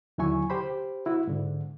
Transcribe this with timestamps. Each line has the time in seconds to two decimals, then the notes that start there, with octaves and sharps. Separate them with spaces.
0.18 D#2 D3 F#3 E4 G#5 C#6
0.50 G4 C5 B5
1.06 E4 F#4
1.27 G#2 D3